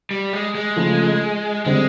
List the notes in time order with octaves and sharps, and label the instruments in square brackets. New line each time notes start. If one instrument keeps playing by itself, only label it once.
[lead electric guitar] G3
G#3
G#3
[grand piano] C#3 F3 A3
[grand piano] D3 G3 C4 [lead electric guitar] G#3